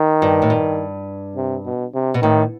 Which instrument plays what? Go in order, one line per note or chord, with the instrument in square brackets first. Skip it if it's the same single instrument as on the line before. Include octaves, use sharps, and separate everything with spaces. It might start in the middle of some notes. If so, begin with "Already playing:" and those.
Already playing: [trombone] D#3
[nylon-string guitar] G2
A2
G2
[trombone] C3
B2
C3
[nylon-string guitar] B2
[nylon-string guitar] A2 [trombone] D#3